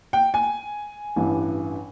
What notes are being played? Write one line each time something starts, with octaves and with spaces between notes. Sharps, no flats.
G5
G#5
A1 G2 E3